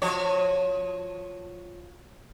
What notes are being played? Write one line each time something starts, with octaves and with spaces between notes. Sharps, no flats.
F3 F#4 C#5